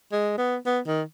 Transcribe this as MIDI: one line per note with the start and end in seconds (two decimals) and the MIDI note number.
0.12 0.34 56
0.38 0.56 59
0.66 0.80 59
0.87 1.03 51